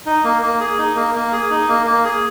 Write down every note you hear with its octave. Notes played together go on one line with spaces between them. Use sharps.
D#4
A#3
A#3
G#4
D#4
A#3
A#3
G#4
D#4
A#3
A#3
G#4